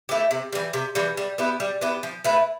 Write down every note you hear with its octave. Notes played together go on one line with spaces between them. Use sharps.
A3 E4 G4
C3
E3 G3
C3
E3 G3
G3
B3 E4 G4
G3
B3 E4 G4
F3
A3 E4 B4